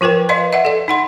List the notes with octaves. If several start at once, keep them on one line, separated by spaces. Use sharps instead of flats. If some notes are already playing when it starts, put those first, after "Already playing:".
F3 F4 A#4 B4 G5
B4 D5 D#5 F5 C6
D#5 E5 F#5
A4 D5
D#4 F#5 C6